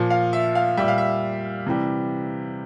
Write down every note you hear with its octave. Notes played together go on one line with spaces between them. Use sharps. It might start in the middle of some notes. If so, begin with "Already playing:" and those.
Already playing: A#2 F3
F5
E5
F5
A#2 G3 E5
F5
E5
C3 E3 G3